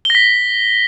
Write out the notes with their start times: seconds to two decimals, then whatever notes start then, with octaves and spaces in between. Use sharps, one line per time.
0.05 G7
0.10 A#6
0.15 B6